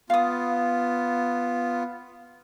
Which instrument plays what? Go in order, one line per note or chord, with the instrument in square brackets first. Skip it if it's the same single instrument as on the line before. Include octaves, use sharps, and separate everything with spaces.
[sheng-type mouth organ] B3 F4 [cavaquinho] F5 D#6